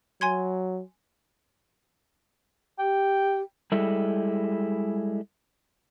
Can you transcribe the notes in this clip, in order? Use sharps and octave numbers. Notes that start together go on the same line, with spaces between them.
F#3 G#5 C6 G#6
G4 G5
G3 G#3 E4 A4